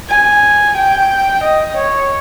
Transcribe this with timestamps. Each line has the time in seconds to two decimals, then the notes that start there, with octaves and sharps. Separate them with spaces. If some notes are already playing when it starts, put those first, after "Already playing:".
0.09 G#5
0.77 G5
1.44 D#5
1.78 C#5